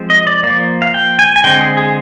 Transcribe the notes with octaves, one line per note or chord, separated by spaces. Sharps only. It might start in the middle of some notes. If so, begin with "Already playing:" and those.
Already playing: F3 G#3 C4
D#5
D5
F3 A#3 D5
F5
G5
G#5
G#5
D3 G#3 C4 G5
G#4
G#4